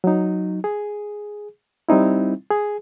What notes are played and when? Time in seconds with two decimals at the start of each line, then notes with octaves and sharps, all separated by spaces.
0.04 F#3 D#4
0.64 G#4
1.89 G3 C4 D#4 E4
2.50 G#4